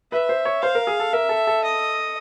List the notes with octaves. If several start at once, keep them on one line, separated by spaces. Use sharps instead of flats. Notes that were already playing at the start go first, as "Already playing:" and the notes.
B4 E5
C5
C#5
C5 F5
A#4
G#4
A4
A#4 E5
A4
A4
D#5